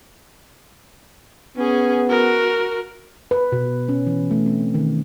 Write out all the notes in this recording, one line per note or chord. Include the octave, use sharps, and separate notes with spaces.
B3 C#4 G#4
F#4 A#4
B4
B2
C#4
E3
A3
C4
D#3